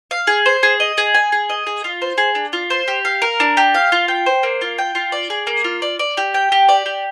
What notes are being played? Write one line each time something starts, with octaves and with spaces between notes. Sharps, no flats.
F5
G#4
C5
G#4
D#5
G#4
G#5
G#4
D#5
G#4
F4
C5
G#4
D4
F4
C5
G4
F5
A#4
D4
G4
F5
F4
G5
C5
A#3
F4
G5
F4
D5
G#4
A#3
F4
D5
D5
G4
G5
G4
D5
G4